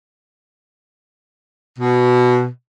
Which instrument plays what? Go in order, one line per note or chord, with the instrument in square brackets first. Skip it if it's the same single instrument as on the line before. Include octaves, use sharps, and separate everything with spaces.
[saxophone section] B2